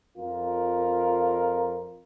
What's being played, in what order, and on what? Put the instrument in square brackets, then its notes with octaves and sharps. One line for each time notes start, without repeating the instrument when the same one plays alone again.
[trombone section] F2 F4 A#4